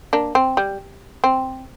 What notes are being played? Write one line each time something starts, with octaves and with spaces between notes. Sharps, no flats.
A#3 D4
C4
G3
C4